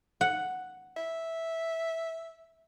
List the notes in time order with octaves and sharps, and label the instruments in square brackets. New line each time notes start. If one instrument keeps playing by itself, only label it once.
[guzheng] F#5
[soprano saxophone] E5